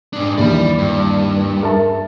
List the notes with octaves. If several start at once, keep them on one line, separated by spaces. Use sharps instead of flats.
G#2 D4
D#2 E3 D5 B5
G2
A#4 E5 A5